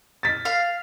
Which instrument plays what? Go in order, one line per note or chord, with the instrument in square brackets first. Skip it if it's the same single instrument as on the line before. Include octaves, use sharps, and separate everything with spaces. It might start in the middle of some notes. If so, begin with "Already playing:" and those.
[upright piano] A6 B6
[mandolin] F5